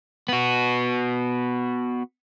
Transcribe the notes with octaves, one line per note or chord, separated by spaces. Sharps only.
B3 F#4